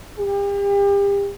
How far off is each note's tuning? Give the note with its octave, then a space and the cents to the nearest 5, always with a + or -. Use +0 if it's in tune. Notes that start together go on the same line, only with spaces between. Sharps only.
G4 +35